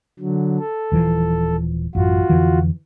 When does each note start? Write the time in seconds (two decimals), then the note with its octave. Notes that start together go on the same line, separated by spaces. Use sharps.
0.19 D3 F#3
0.59 A4
0.92 D#1 E3 F3
1.95 A1 F#2 F4 F#4
2.30 F2 D3 E3